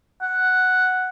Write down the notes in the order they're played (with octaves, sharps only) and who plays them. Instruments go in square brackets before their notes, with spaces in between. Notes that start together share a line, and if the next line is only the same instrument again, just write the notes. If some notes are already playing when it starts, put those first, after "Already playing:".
[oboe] F#5